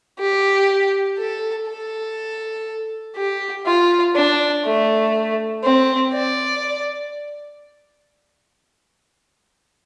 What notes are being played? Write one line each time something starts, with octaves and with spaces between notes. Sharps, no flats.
G4
A4
A4
G4
F4
D4
A3
C4
D5